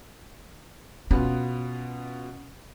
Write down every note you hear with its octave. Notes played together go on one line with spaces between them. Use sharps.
B2 B3 C#4 F4